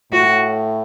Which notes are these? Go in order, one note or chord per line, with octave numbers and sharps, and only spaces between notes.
A2 F#4